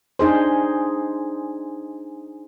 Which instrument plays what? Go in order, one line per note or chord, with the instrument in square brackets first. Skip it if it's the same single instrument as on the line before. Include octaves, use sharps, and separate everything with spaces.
[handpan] D4 D#4 G#4 C5